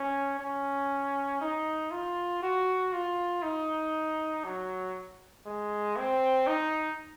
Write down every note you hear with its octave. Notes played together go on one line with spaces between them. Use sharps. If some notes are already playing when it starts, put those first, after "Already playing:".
Already playing: C#4
C#4
D#4
F4
F#4
F4
D#4
F#3
G#3
C4
D#4